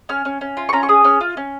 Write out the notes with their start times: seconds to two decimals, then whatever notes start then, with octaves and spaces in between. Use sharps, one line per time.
0.09 C#4 F6
0.25 C#4
0.41 C#4
0.57 F4
0.69 C#6
0.73 C#4 A#5
0.83 C#6
0.89 G#4 D#6
1.04 C#4 F6
1.21 F4
1.37 C#4